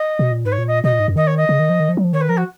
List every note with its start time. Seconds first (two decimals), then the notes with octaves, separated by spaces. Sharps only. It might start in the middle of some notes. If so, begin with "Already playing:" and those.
Already playing: D#5
0.19 B2
0.32 A#2
0.45 G#2 B4
0.52 C#5
0.58 A#2
0.68 D#5
0.84 B2 D#5
0.92 A#2
1.00 G#2
1.08 F#2
1.16 D#3 D#5
1.27 C#5
1.37 D#5
1.49 C#3
1.59 D#3
1.69 F3
1.80 D#3
1.89 F3
1.97 F#3
2.04 F3
2.13 D#3 C#5
2.21 B4
2.29 F3 A#4
2.37 F#4